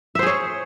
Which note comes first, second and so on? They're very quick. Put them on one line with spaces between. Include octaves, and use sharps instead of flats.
E5 C5 G#4 C#5